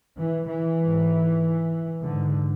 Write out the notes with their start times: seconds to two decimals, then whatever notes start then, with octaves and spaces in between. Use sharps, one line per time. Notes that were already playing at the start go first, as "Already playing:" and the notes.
0.19 E3
0.49 E3
0.80 G#2
2.03 G#2 D3